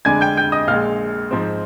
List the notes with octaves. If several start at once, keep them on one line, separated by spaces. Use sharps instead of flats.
F2 D3 G#3 D4 G#5 G#6
G5 G6
G5 G6
D#5 D#6
A#1 A#2 G#3 F5 F6
G#2 F3 C4